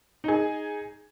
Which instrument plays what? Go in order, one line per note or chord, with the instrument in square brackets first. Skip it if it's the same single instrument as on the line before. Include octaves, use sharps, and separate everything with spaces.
[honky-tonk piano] D#4 G#4